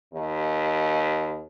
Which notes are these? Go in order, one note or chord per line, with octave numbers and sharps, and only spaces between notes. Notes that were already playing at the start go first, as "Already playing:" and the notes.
D#2